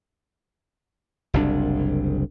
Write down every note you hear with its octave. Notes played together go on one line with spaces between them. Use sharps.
F#1 C2 D4